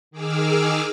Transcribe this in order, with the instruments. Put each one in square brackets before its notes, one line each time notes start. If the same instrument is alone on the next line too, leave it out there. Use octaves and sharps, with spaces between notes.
[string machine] D#3 G#4 D6 E6 F6